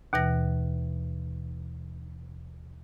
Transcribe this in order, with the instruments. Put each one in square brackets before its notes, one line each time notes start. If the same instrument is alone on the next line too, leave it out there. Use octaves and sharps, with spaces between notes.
[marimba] D#2 B2 E3 A#6